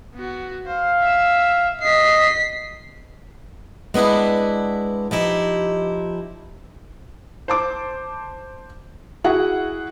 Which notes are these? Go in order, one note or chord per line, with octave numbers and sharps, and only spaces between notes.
B3 F#4
C5 F5
E5 E6
D#5 B6 C7
G#3 B3 D4 E4 B4
F3 D#4 E4 G4
C5 A5 D6
E4 F#4 G#4 F#5